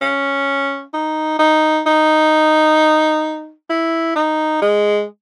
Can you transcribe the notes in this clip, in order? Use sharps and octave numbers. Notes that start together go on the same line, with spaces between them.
C#4
D#4
D#4
D#4
E4
D#4
G#3